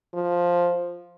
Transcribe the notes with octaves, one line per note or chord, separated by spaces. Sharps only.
F3